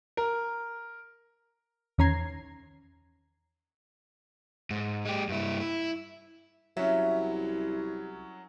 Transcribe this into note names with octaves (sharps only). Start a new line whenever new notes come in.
A#4
E2 D#3 C#4 A#5 G#6 C7
G#2
G#3 G4
G2 E4
E4
C2 F#3 C#4 E5